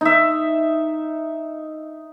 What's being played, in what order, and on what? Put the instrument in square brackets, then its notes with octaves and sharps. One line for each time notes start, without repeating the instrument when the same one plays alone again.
[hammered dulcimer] D#4 E5